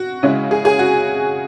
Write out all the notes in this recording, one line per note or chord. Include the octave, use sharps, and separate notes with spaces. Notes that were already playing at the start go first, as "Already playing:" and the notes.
Already playing: F#4
C#3 G#3 C#4 E4
G#4
G#4
F#4